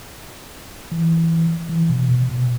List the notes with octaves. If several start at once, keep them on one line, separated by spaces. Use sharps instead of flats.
E3
E3
B2
B2
B2